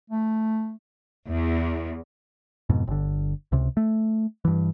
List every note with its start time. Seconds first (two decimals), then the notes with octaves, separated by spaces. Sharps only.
0.10 A3
1.27 E2
2.69 F2 G#2 B2
2.87 G1 D3
3.52 C#2 C3
3.77 A3
4.45 G2 E3